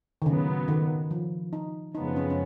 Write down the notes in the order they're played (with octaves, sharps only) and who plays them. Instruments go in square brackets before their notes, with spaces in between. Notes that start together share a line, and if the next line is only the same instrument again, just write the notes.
[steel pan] D#3
[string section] A#2 F#3 B3 [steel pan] C#3
[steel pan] D#3
F3
D#4
[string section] F#2 C#3 F3 G#3 B3 [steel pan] D#4
[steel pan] C#4
C#4